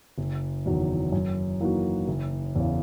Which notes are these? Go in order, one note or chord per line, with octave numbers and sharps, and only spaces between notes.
F#1
E2 D#3 F#3
F#2
E3 A#3 D#4 F#4
F#1
E2 C#3